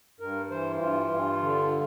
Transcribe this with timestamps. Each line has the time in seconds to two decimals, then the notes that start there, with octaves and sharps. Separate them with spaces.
0.20 G2 A#4
0.50 E3 C5
0.81 G2 F4
1.11 G2
1.42 D3